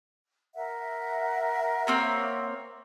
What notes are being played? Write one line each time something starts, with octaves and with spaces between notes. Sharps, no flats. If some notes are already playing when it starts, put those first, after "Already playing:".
A#4 E5 F#5
A#3 C4 C#5